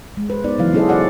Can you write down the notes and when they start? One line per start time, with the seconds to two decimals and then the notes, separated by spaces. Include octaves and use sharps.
0.17 G#3
0.30 B4 C5
0.44 B3 D#4 D5
0.58 C#3 E3 F#3 E4 F5
0.73 C#4 E4 G#4 A4 C5 D#5
0.89 F#4 D5 F#5